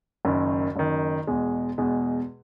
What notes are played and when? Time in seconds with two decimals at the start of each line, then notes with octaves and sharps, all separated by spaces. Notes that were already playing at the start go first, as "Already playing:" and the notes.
0.25 F#1 F#2 D#3
0.76 F#1 F#2 D#3
1.27 E2 B2 G#3
1.78 E2 B2 G#3